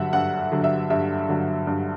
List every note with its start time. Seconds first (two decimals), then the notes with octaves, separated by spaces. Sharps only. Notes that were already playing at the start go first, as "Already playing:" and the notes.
Already playing: G2 D3 F#3 E5 F#5
0.13 G2 F#5
0.52 D3 F#3
0.64 E5
0.90 G2 E5
1.29 D3 F#3
1.67 G2